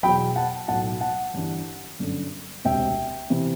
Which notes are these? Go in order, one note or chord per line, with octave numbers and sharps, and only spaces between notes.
E2 B2 F#3 G5 B5
F#5 A5
B1 A2 F#3 F#5 A5
F#5 A5
G1 G2 E3
G1 F#2 D3
E1 D2 C3 E5 G5
C3 E3